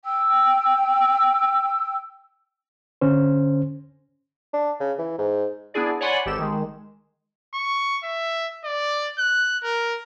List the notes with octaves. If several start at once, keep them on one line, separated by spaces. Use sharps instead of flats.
G5 E6
D3 C#4 C5
D4
C#3
E3
G#2
B3 D4 E4 G#4 D5
C#5 D5 F#5 G#5 B5 C6
G#1 G4 A4 E7
D#3 G#3
C#6
E5
D5
F#6
A#4